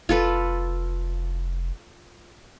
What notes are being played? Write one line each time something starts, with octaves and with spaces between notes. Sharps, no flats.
F1 F4 A4 B4